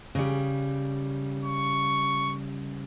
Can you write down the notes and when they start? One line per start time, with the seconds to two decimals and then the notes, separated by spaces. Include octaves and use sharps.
0.15 C#3 G3
1.45 C#6